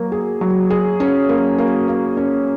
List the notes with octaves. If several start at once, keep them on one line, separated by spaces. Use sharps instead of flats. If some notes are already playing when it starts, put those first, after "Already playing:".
Already playing: F#3 A#3
G#4
F#3
G#4
C#4
A#3
A#3
A#3
C#4